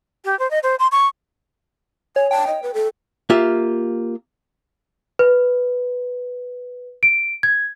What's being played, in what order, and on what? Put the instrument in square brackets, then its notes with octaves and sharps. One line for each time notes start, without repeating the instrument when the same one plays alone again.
[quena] G4
C5
D#5
C5
C6
C#6
[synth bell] C#5 [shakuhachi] G#5
[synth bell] G5 [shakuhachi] A5
[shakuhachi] D#5
B4
A4
[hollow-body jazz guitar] A#3 F4 G4 E5
[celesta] B4
D7
G#6